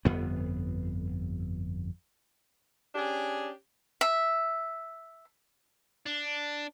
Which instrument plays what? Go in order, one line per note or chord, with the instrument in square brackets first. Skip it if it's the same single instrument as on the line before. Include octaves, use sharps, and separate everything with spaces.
[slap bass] G1 F2 B3
[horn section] C#4 D4 G4 G#4
[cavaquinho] E5
[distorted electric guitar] D4